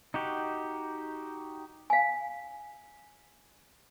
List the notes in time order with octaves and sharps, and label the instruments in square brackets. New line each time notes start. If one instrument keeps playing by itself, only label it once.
[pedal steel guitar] D#4 F#4 G4
[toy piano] F5 G#5